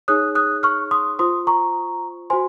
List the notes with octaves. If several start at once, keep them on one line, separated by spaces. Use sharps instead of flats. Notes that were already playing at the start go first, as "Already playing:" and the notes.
D#4 G#4 C#5 D#6 F#6
D#6 F#6
C#6 F6
C6 D#6
F4 C5 C6 D#6
A#5 C#6
F#4 C5 G#5 C6